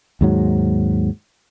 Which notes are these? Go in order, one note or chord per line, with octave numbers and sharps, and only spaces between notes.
D#2 G#2 F#3